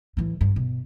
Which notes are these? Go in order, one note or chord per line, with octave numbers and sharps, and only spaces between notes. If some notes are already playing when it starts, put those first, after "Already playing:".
A2 E3
G2
B2